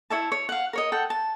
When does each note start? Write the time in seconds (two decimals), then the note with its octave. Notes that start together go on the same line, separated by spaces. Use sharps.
0.10 E4 C#5 E5 A5
0.32 C#5
0.49 F5 F#5
0.73 A#4 C#5 D#5
0.92 A4 F#5 G5
1.10 A5